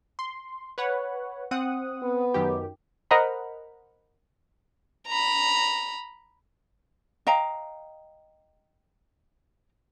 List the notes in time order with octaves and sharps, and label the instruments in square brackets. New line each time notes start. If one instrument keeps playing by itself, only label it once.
[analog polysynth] C6
B4 C#5 F#5
C4 F#5 D#6
[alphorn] B3
[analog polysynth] F#2 D#3 G4
[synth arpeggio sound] A#4 C5 D#5 F#5 A#5 B5
[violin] A#5 B5
[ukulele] D#5 F5 G5 A#5